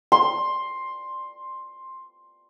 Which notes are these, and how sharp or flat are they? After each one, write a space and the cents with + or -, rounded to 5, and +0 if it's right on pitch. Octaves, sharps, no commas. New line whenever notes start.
C6 +10